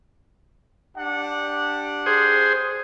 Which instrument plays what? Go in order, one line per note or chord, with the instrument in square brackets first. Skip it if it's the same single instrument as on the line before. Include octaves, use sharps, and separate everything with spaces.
[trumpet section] D4 G4 F#5
[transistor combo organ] G#4 C5